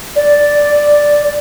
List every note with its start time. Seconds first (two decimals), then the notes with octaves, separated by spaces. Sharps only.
0.16 D5